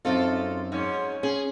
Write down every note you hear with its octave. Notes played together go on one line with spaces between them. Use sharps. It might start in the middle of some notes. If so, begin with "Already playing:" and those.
F#2 C4 D#4 F4 A4
G#2 C#4
C#4 G#4